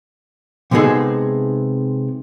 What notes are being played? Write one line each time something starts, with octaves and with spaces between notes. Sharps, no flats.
C3 G#3 B3 D#4 G#4 A4